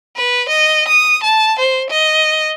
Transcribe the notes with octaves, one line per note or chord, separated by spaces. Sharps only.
B4
D#5
D#6
A5
C5
D#5